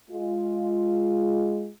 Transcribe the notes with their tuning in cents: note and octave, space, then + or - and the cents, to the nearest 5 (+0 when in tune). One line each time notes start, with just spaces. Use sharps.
G#3 +0 F4 +0